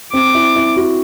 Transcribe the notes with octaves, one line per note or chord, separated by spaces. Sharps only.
C4 D6
E4
E4
F#4